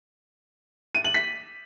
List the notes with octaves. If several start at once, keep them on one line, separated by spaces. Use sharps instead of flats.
D#7
F#7
B6